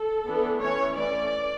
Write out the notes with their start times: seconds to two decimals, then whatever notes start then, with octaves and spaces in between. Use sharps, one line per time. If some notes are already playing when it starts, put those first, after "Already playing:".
Already playing: A4
0.26 E3 B3 D4
0.61 E3 A3 C#4 C#5
0.96 E3 A3 C#4 D5